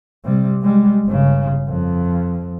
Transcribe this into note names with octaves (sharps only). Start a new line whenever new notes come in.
C3 G3
G3 G#3
G1 C#3
F2